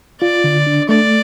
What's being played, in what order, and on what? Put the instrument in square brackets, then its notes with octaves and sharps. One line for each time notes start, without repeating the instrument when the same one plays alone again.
[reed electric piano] F4 [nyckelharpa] D5
[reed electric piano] D3
D4
[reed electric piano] A3 [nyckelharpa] D5